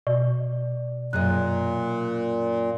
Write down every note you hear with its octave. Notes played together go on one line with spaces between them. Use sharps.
B2 D5
F#2 A#2 G#4 D#5 F#6